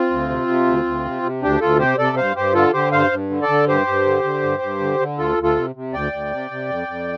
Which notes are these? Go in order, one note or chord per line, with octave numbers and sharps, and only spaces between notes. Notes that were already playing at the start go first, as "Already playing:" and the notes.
Already playing: C4 F4
D2
C3
C3
D2
D2
C3
C3
D2 D4 G4
D2 F4 A4
C3 G4 C5
C3 A4 D5
G2 C5 F5
G2 G4 C5
D3 F4 A4
D3 G4 C5
G2 C5 F5
G2
D3
A4 D5
D3
G2 G4 C5
G2
D3
D3
G2
G2
D3
D3
D2 F4 A4
D2
F4 A4
C3
C3
D2 D5 G5
D2
C3
C3
F2
F2